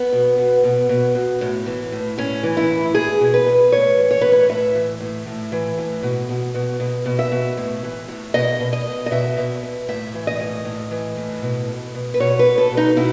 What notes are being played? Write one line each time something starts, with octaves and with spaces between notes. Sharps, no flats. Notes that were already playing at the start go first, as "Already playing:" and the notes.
Already playing: B3
B2
B2
B2
B2
B2
A2
E3
A2
A2 C#4
E3
E4
A2
B2 G#4
B2
B4
B2
A2 C#5
E3
C#5
A2 B4
C#5
A2 E5
E3
A2
A2
E3
A2
B2
B2
B2
B2
B2
E5
B2
A2
E3
A2
B2 D#5
B2
D#5
B2
D#5
B2 E5
B2
B2
A2 E5
E3
D#5
A2
A2
E3
A2
B2
B2
B2
B4
B2 C#5
B4
B2
A4
B2
D#4
B2 E4